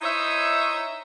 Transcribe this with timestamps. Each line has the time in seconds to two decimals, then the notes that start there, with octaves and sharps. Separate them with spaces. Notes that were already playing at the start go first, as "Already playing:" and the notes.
0.01 D#4 E4 C5 C#5 D#5 E5